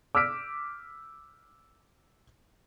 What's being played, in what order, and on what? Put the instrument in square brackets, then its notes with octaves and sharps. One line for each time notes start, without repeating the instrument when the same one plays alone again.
[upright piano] D6 E6 F6 B6 D7